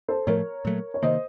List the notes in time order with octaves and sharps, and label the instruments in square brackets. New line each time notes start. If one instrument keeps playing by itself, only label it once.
[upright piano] A4 C5
[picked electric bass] A2 F3 A3 [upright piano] A#4 C#5
[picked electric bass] A#2 F#3 A3
[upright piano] C#5
[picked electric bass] C3 D#3 A#3 [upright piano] C5 D#5